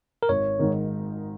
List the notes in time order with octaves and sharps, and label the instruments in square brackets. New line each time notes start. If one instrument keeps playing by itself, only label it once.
[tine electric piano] A#4
[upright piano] G#1 [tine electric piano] C#5
[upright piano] G#2 D#3